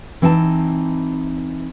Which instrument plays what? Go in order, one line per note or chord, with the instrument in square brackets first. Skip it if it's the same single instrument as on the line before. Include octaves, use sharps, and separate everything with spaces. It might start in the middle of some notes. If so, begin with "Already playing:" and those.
[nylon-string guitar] E3 C4 D#4 G5 A5